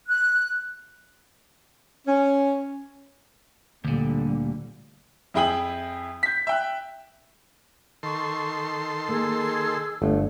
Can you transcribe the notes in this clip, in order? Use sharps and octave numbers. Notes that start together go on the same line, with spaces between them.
F#6
C#4
D2 A#2 D3 G3
F2 E4 G#4 G5 D#6 F#7
G6 B6
E5 G5 F#6
D#3 A4 C6 C#6
A#3 G#4 E6
G1 A3